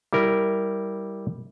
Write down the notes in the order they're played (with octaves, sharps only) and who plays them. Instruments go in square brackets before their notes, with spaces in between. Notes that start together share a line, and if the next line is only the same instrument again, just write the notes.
[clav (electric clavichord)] G3 E4 A#4